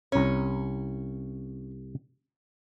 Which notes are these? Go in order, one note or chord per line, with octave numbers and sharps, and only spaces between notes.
C2 C#4 A#5